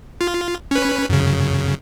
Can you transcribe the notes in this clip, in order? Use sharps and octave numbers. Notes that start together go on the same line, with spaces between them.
F4
C#4 B4
F#2 C#3